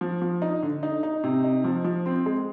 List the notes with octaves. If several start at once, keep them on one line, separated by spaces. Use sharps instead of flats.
F3
F3
D#4
D3
D#4
D#4
C3
D#4
F3
F3
C4
G#3